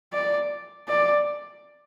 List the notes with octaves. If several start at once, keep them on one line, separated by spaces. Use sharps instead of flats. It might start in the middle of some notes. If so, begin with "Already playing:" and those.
D5
D5